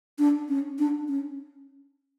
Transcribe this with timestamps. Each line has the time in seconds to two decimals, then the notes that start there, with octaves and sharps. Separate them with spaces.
0.19 D4
0.49 C#4
0.79 D4
1.08 C#4